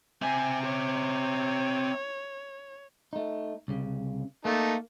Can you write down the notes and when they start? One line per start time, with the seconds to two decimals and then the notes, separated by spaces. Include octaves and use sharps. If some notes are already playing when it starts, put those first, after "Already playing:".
0.22 C4 E5 G#5
0.64 C#5
3.13 A3 D#4
3.68 C2 C#3
4.45 A3 A#3 D#4 A5